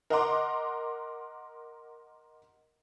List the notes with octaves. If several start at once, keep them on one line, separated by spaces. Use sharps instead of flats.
A#4 D#5 F#5 A#5 C6 D6